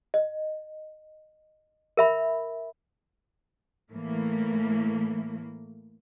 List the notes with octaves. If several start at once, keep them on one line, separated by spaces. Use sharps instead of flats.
D#5
A#4 E5 B5
A2 E3 A3 A#3